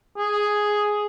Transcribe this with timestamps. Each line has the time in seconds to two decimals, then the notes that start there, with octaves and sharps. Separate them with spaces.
0.17 G#4